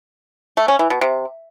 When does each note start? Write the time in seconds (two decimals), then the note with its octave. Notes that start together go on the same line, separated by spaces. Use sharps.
0.57 A3
0.68 C#4
0.79 E3
0.90 B2
1.01 C3